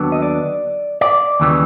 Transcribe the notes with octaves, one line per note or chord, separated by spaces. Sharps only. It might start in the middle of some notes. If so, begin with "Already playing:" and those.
Already playing: D#2 D3 F#3 B3 D4
D#5
D5
D5
D#2 C#3 E3 G3 A#3